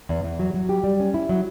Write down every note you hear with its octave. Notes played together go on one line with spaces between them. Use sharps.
E2
E2
F#3
F#3
G4
G3
C#4
E4
F#3